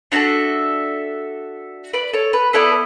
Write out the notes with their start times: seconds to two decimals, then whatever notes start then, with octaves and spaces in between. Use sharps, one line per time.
0.12 D4 F#4 A4 C#5 E5
1.93 B4 D5
2.13 A4 C#5
2.33 B4
2.53 B3 E4 A4 B4 D5